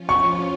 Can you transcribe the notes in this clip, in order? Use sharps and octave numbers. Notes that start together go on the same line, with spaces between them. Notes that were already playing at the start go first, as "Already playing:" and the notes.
Already playing: F3 C#4 F4
C#6